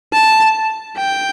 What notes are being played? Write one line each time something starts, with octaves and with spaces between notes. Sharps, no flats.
A5
G5